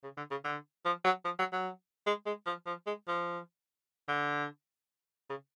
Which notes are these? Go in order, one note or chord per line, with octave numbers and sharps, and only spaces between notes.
C#3
D3
C#3
D3
F3
F#3
F3
F#3
F#3
G#3
G#3
F3
F3
G#3
F3
D3
C#3